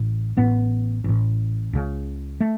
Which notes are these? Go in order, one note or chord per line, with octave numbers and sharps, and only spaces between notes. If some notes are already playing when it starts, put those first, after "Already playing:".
Already playing: A1 A2
A1 A2 B3
A1 A2
C#2 C#3
A3